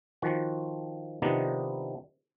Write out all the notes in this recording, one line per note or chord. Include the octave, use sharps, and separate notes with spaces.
D#3 F3 F#4
C3 D#3 F3 B3 D4 D#4